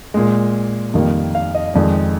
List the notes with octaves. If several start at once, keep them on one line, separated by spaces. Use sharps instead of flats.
A#2 G#3
F2 D#3 G3 A#3
F5
D#5
F2 D#3 G#3 D5